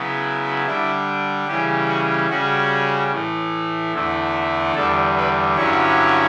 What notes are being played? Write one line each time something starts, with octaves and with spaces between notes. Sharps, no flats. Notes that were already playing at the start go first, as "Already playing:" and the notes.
Already playing: C#3 F#3 B3 E4
D3 G3 D4 E4
C#3 E3 G3 C#4 G4
F#4
C#3 G3 C#4 F#4
A2 E3 A3
E2 D3 A3 E4
E2 D3 G3 A4
B4
G2 D3 F#3 C#4 E4 C#5